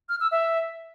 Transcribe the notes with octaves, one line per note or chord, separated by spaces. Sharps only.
F6
E6
E5